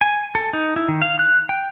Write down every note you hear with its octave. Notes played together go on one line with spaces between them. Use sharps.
G#5
A4
D#4
E4
D#3
F5
F#6
G5